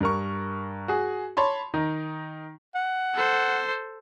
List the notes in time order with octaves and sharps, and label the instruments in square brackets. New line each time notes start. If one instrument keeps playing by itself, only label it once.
[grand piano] G2 A#4 C#6
F#4 G#4
C#5 A5 B5 C6
D#3 D#4
[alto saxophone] F#5
[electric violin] A4 C5